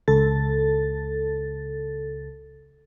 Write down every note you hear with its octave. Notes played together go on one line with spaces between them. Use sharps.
C#2 A4 A6